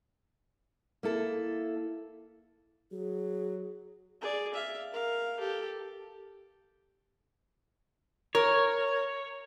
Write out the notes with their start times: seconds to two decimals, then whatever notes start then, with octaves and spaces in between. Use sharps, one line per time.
1.03 A#3 E4 A4
2.92 F#3 G#4
4.21 G#4 D5
4.54 E5 F5
4.92 A#4 F5
5.39 G4 A4
8.35 A#4 C#5